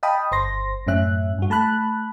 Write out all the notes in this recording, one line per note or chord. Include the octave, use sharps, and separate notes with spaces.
D#5 F5 G5 A5 B5 D#6
G1 C5 C6 A#6
F#2 A2 A3 C#4 E5 F#6
G2 F#4
A3 A5 B5 F#6